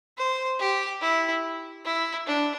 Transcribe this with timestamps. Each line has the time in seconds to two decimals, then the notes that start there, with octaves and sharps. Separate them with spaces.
0.18 C5
0.59 G4
1.01 E4
1.85 E4
2.26 D4